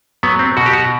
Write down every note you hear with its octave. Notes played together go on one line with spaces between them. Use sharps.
F#3 B3
C4
B2 F#4
G4
F#4